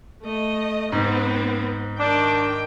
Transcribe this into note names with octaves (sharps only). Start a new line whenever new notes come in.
A3 D#5
G#2 B3 C4
D#3 D4 G5